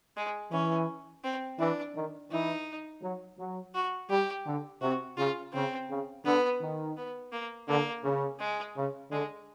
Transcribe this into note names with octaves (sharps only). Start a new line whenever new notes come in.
G#3
E3 C#4
C4
E3 D4
D#3
E3 D#4
F#3
F#3
F#4
G3 G4
D3
C3 F#4
C#3 F4
C#3 C4
C#3
D3 B3
D#3
B3
A#3
D3 A#3
C#3
G#3
C#3
D3 G#3